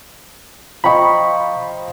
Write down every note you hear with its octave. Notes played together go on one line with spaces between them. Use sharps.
F3 D#5 G5 A#5 B5 C#6